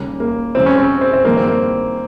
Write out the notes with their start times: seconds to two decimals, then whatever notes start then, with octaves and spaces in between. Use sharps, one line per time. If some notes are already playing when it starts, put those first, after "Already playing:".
Already playing: D#2 C#3 G3 A#3
0.20 A#3
0.55 F2 C#3 G3 C4
0.66 C#4
0.78 C4
1.01 C4
1.13 C4
1.25 G2 D#3 G3 A#3
1.37 C4
1.48 A#3